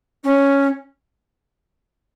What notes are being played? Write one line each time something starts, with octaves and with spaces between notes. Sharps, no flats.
C#4